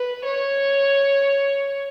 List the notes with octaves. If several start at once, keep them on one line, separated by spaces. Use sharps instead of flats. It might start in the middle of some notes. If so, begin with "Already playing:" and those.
Already playing: B4
C#5